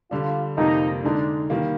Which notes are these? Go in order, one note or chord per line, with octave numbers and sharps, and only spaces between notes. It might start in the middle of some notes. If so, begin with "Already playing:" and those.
D3 G3 D4 F4
F2 C3 G3 A#3 D#4
D3 G#3 D4 D#4
D#3 G3 A#3